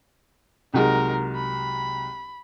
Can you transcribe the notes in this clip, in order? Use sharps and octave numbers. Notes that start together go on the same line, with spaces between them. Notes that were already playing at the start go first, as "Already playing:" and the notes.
C2 F#3 G#3 D#4 A#4
B5